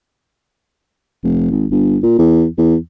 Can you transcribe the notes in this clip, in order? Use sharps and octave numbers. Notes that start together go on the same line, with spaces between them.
F1
G#1
G1
A#2
E2
E2